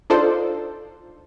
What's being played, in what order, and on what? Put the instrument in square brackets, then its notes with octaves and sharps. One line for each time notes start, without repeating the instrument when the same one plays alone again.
[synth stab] D4 D#4 F4 A4 C5 D5